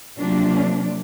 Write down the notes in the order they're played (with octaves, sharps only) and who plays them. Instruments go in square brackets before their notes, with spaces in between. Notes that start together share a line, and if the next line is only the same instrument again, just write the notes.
[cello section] C3 F3 F#3 A#3 D4